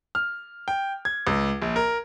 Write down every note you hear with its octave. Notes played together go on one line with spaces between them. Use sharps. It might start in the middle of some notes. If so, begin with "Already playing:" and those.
F6
G5
G#6
C#2
A#1
A#4